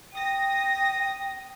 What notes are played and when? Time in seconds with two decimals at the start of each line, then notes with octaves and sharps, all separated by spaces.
0.13 G5 D#6 A#6